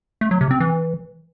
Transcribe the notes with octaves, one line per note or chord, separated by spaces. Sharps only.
A3
F#3
C3
C4
E3